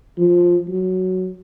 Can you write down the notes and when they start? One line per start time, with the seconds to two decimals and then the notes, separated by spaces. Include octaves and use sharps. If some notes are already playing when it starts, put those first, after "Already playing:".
0.18 F3
0.69 F#3